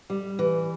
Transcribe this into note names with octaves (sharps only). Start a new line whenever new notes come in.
G3
E3